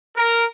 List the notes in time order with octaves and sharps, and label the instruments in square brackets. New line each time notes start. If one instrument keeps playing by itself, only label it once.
[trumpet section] A#4